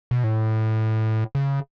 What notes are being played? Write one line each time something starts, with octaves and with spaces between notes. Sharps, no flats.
B2
A2
C#3